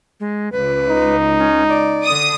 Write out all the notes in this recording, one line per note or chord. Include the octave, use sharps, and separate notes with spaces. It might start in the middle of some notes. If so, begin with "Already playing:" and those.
G#3
C#2 B4
D#4
C#4
D5
D3 D#6